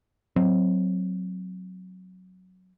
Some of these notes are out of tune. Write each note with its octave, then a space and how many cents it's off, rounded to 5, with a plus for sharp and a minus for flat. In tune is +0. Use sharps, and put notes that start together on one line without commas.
F#3 +0 C4 +0